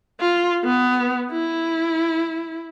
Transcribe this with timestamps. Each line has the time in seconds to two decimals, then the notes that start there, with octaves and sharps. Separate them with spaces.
0.21 F4
0.65 B3
1.32 E4